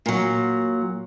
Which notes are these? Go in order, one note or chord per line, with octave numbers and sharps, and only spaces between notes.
A#2 F#3